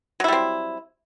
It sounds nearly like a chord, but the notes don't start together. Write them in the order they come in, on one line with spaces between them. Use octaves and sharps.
F#3 E4 G3 C4